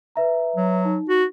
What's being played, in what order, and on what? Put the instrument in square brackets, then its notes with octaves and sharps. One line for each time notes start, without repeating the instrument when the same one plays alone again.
[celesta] B4 E5 A#5
[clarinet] F#3
[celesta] D#4
[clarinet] F#4